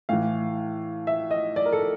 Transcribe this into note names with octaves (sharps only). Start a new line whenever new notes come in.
A2 E3 F5
E5
D#5
D5
A#4
A4